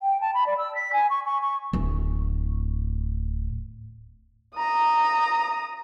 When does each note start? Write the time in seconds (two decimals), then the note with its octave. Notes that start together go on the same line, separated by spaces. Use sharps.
0.01 G5
0.21 A5
0.34 B5
0.46 D5
0.58 E6
0.75 B6
0.93 G#5
1.10 C#6
1.25 C#6
1.41 C#6
1.73 D1 A2
4.57 A#5 D#6